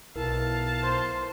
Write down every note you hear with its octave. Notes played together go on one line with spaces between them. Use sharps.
B1 E4 A#4 F5 A5
C5